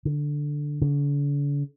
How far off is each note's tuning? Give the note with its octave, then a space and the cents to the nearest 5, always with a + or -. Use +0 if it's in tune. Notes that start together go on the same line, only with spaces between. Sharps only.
D3 +0
D3 -45